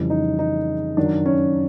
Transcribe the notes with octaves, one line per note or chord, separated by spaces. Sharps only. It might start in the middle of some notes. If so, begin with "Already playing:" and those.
Already playing: F2 C#3 E3 G3
D#4
D#4
F#2 D#3 F#3 D4
C#4